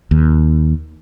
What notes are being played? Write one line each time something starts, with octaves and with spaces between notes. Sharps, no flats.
D#2